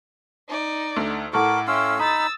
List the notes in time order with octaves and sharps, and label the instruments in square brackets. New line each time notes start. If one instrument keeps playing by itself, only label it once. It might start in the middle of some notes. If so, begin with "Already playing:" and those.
[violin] D#4 D5
[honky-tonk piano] D2 A3
[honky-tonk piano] A2 A4 [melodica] A#4 [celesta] F#5 A5 C#6 [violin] D6
[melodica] C#4 F5 E6 [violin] E4 G5 [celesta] C6
[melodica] D#4 B5 [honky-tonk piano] D#6 [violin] E6 A6